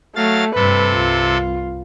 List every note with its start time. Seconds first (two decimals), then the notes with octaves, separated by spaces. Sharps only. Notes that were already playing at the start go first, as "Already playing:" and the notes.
0.16 F#3 A3 F5 A6
0.55 G2 C3 A4 B4
0.93 C2 F4